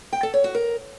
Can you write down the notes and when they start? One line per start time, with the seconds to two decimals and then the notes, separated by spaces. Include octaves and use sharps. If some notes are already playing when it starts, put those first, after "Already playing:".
0.13 G5
0.23 A4
0.34 C#5
0.44 F#4
0.55 A#4